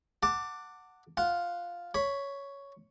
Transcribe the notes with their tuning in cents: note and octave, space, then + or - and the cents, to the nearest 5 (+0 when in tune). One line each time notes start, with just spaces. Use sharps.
F#5 +0 A5 +30 D6 +0
F4 +0 F#5 +0
C#5 +5 B5 +0